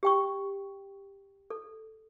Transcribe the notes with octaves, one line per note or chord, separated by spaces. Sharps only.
G4 G5 C#6
A4